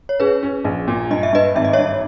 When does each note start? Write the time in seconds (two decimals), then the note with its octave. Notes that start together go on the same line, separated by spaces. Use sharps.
0.09 C#5
0.20 C#4 G#4 B4
0.43 C#4
0.64 A#1
0.88 A#2
1.10 G2 D#5
1.23 E5
1.33 G2 B4 D#5
1.55 G#1 E5
1.65 D#5
1.73 G2 C#5 E5